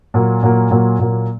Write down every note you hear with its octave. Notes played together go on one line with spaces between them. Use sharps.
A#2 F#3 A#3
A#2 F#3 A#3
A#2 F#3 A#3
A#2 F#3 A#3